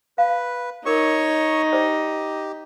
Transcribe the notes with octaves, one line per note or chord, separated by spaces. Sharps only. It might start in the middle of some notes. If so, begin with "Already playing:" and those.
B4 F5
D#4 F4 A#4 C#5 C#6 D6
G4 C5 D5 D#5